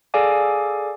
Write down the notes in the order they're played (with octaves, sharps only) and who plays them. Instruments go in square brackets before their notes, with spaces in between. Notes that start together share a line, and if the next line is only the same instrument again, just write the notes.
[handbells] G#4 A4 D5 F5 G#5 D6